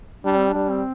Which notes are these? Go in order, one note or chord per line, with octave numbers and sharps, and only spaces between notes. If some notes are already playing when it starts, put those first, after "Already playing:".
G3 D4
C4
G3 D4
C4